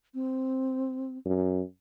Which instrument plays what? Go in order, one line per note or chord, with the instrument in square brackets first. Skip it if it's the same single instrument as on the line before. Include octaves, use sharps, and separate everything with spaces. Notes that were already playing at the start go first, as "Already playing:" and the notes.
[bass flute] C4
[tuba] F#2